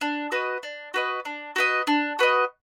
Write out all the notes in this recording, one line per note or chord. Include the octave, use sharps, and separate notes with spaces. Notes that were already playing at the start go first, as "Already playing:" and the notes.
D4
F#4 B4 D#5
D4
F#4 B4 D#5
D4
F#4 B4 D#5
D4
F#4 B4 D#5